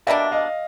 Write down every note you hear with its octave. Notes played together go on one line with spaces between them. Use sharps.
B2 G3 A#3 D4 D5 E5
D#5 F5